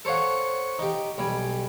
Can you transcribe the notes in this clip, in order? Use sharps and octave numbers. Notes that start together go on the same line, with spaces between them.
A4 C5 C#5 F5 F#5
D#4 G4
B1 G3 G#5